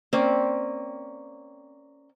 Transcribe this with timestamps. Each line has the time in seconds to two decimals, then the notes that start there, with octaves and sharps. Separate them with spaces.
0.13 A#3 C4 C#4 D5